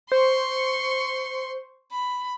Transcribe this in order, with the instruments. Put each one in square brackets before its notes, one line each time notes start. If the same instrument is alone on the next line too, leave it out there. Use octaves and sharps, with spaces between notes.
[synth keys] C5 [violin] C6 C#6
[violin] B5